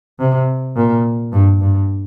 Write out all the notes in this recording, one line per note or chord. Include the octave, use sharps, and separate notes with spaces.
C3
A#2
G2
G2